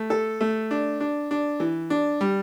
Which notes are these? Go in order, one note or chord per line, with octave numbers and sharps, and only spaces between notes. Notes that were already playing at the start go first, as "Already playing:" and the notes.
Already playing: A3
A4
A3
D4
D4
D4
E3
D4
G3